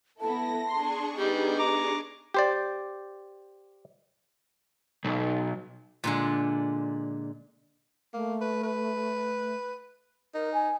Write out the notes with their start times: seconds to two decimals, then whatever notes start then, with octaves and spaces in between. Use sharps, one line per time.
0.21 B3 E4 A4 A5 A#6
0.68 D4 G#4 C6 C#6
1.17 G3 B3 D#4 G4
1.59 A#5 D6
2.34 G4 C5 D5
5.05 B1
6.04 A#2 D3 G#3
8.14 A3 A#3
8.41 B4
8.64 B4
10.34 D#4 A#4
10.53 G#5